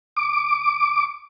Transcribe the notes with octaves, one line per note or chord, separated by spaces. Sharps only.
D6